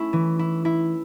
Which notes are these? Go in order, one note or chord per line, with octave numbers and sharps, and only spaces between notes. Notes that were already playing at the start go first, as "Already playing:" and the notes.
Already playing: A3 C#4 E4
E3
E4
E4